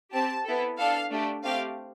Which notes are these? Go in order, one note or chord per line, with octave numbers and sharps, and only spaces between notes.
C4 G4 A5
B3 E4 A4
D4 A4 F5
A3 D4 G4
A3 C4 G4 F5